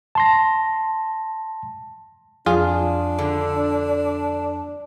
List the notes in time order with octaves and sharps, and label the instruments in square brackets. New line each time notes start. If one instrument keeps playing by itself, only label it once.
[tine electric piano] A5 C6 A#6
[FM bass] F2 [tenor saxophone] D4 [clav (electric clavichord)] F4 [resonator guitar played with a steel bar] G#4
[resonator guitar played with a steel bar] D3